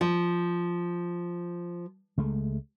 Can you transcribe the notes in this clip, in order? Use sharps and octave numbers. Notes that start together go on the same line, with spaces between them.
F3
C#2 G#3 A3